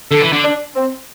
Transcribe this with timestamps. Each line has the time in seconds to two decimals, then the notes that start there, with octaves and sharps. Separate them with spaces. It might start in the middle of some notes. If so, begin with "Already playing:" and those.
0.11 D3 A4
0.22 E3
0.33 D3
0.43 D4
0.75 C4